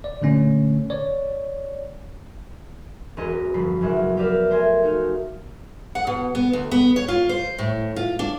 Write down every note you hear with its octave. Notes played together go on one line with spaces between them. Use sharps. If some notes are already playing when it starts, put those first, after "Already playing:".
D5
A#2 D3 A3 C#4
C#5 D5
E1 C#4 F#4 B4 D#5 A#5
G1 B2 F3 B4 B5 C7
F#1 F#2 G#3 E5 F#5
G4 A#4 B4 D5 E5 F5
A3 A#4 C5 E5 G#5
D#4 F#4 F5
F#5
B2
B3
D2
B3
C#5
F4
C5
A2
F4
D4